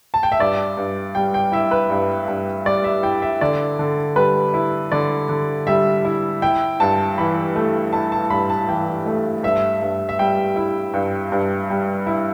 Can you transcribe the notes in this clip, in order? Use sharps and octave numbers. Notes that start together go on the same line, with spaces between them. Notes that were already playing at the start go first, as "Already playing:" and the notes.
A5
G5
E5
G2 D5
G2
G3 G5
G5
E4 E5
B4
G2
G2
G3 D5
E5
E4 G5
E5
D3 D5
D3
G3 B4
E4
D3 D5
D3
G3 E5
E4
E4 G5
G2 A5
E3 B5
A3
E4 A5
A5
G2 B5
A5
E3 G5
A3
G2 E5
G2
E5
G3 G5
E4
G2
G2
G3
E4